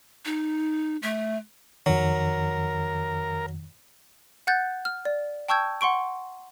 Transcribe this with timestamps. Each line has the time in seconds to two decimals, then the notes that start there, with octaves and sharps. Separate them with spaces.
0.25 D#4
1.02 A3
1.86 F2 D#3 F#3 A#4
4.47 F#5 F#6 G6 A6
4.85 F6
5.05 D5
5.48 G5 A5 C#6 E6 G6 G#6
5.81 F#5 C6 C#6 D7